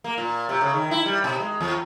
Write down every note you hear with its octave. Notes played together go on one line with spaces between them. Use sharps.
A#3
A#2
C3
C#3
D#3
E4
G3
B2
G#3
E2